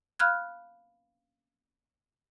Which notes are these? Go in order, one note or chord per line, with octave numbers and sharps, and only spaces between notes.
F5 B5 F6 F#6 G#6